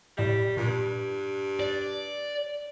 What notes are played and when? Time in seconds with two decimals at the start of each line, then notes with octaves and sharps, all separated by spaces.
0.17 A2 G3 D5 E7
0.57 G2 A#2
1.60 D5